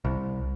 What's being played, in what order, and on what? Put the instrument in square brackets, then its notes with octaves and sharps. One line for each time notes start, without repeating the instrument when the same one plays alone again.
[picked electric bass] C2